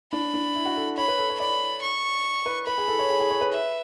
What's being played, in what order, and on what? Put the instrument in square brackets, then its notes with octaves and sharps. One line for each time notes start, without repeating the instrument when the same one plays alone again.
[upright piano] D4 [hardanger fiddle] B5
[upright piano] D4
E4
F#4
A4
[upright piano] C#5 [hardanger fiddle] B5
[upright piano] B4
A4
C#5
[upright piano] D5 [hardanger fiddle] B5
[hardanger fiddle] C#6
[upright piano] B4
[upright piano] B4 [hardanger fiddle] B5
[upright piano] G#4
A4
C#5
G#4
G#4
C#5
B4
[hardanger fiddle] E5